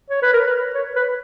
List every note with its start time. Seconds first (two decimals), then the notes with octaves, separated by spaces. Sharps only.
0.10 C#5
0.22 B4
0.33 A#4
0.47 B4
0.75 C#5
0.96 B4